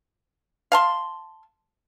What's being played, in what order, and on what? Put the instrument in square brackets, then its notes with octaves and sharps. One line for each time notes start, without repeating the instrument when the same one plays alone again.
[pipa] F5 A5 C6